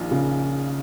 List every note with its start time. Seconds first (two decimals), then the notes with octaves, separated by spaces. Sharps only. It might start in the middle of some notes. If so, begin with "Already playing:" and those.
Already playing: A#1 D#3 F4
0.11 C#3